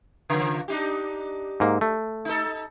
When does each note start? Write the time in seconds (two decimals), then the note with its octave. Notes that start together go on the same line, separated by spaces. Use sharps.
0.30 C#3 F3
0.68 D4 D#4 G4
1.60 G#2 A#3
1.81 A3
2.25 D#4 A4